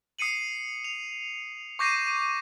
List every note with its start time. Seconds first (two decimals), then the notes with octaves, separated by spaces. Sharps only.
0.19 D#6 C7 C#7 D#7 F#7
0.84 F7
1.79 C#6 D6 G6 A#6 C7 D#7